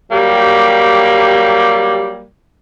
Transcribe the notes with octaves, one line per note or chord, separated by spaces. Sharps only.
F#3 G3 A#3 G4